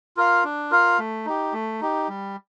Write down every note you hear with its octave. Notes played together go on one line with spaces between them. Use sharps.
F4 A#4 F5
D4
F4 A#4 F5
A3
D#4 G4
A3
D#4 G4
G3